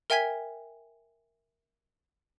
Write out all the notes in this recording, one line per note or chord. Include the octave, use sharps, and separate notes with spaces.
A#4 E5 G5 G#5 G#6 B6